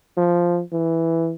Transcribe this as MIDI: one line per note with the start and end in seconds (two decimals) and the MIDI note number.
0.17 0.61 53
0.72 1.34 52